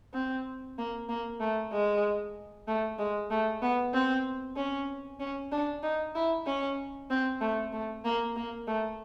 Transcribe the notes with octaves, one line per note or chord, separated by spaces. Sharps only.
C4
A#3
A#3
A3
G#3
A3
G#3
A3
B3
C4
C#4
C#4
D4
D#4
E4
C#4
C4
A3
A3
A#3
A#3
A3